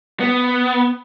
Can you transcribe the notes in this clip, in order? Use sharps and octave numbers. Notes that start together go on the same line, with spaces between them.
B3